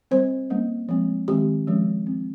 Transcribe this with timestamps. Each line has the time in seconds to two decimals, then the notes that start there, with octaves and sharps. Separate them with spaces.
0.11 G3 C4 C5
0.50 G3 A#3 C#4
0.89 F3 G#3 C4
1.28 D#3 G#3 C4 G4
1.67 F3 G#3 C#4
2.06 F3 C4